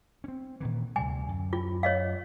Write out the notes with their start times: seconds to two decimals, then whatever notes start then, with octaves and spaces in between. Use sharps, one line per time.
0.24 C4 C#4
0.60 A#2 D#3 E3
0.96 D2 C3 G3 G#5
1.28 F#2
1.53 F4
1.83 C#5 D#5 F5